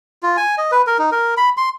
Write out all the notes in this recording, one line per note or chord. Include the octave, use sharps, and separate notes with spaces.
F4
G#5
D#5
B4
A#4
D#4
A#4
B5
C6